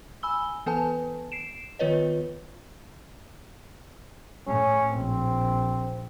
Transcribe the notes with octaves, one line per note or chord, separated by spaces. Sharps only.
G#5 B5 E6 G7
E3 B3 A4 B4 G#5 A5
C7 D7 E7
D#3 B3 F4 B4 C#5 D#5
A2 C#4
A#1 C4